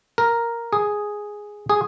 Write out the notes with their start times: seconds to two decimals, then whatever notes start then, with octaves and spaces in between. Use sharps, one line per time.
0.18 A#4
0.73 G#4
1.70 G#4